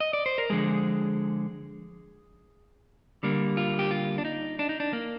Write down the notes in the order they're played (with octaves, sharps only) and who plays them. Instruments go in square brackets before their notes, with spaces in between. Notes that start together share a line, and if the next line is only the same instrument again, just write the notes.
[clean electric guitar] D#5
D5
C5
A#4
D3 F3 G#3 G#4
D3 G3 A#3
F4
G4
F4
D4
D#4
D4
D#4
D4
A#3